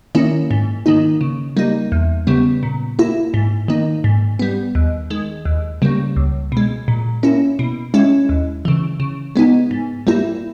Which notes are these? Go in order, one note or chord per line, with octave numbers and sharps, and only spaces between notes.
D#3 A#3 C#4 E4
G#2
D#3 A#3 D#4
C#3
G3 A#3 D#4
E2
C#3 G3 B3
A#2
A#3 E4
G#2
D#3 A#3 D#4
G#2
G3 B3
D#2
D#3 G#3
D#2
C#3 G3 A#3
C#2
B2 G#3
A#2
A#3 C#4 E4
B2
G#3 C#4 E4
D#2
C#3 E3
C#3
G#3 B3 D#4
G#2
G3 A#3 E4